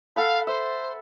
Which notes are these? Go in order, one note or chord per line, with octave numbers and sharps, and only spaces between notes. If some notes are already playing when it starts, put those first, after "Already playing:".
A4 F5 F#5 B5
C5 E5